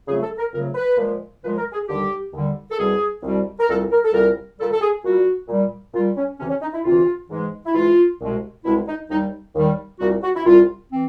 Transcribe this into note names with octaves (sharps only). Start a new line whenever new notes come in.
F2 C#3 F#3 A3 G#4
A4
A#4
F2 C#3 F#3 A3 A#4
B4
A#2 F3 G#3
A#2 F3 G#3 B4
A#4
G#4
D#2 D3 G3 G4
D#2 D3 G3
A4
C2 B2 G3 G#4
C2 B2 G3
A#4
C2 A#2 G3 A4
A#4
A4
C2 A#2 G3 A#4
A#2 G3 A4
A4
G#4
A#2 G3 F#4
A#2 G3
A#2 G3 F4
C#4
D2 C3 E3 C#4
C#4
D#4
E4
D2 C3 E3 F4
G#2 E3 G#3
E4
G#2 E3 G#3 F4
C2 B2 G#3
C2 B2 G#3 E4
D#4
D#2 D#3 G3 D#4
D#2 D#3 G3
C2 A#2 G3 F#4
F#4
E4
C2 A#2 G3 F4
E3 C4